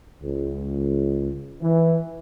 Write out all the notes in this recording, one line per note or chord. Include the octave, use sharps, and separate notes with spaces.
C#2
E3